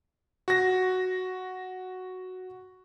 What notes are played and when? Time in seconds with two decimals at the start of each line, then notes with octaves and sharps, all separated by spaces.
0.48 F#4 A#6